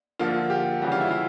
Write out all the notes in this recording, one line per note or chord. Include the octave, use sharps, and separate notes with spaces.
D3 F3 A#3 F4
G4
C#3 E3 G3 F#4
F4
E4
F4